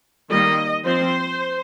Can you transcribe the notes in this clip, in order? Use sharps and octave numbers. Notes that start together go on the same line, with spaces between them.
D#3 G3 A#3 D#5
F3 C4 C5